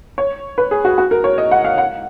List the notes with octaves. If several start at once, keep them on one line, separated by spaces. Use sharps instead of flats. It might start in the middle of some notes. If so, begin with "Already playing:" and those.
C#5
B4
G#4
F#4
F#4
A#4
C#5
D#5
F#5
F5
F#5